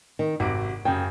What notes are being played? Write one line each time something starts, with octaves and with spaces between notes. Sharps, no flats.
D#3
G#1 C3 F#4 D7
F#2 C#3 G5